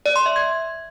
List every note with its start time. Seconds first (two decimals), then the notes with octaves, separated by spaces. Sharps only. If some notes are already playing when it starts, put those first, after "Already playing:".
0.06 D5
0.16 C6
0.26 E5
0.36 G#6